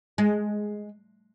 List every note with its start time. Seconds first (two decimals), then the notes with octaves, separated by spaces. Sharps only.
0.18 G#3